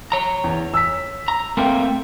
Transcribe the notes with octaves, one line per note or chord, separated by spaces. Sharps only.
C#5 A#5
E2
E6 B6
A#5
A3 A#3 C4 G5 C6